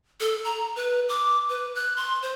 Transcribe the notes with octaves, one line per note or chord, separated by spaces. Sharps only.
A4
A#5
B4
D6
B4
F#6
C6
C5